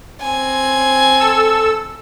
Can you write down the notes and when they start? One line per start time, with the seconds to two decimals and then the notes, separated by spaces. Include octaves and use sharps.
0.22 C4 G#5
1.20 A4 E6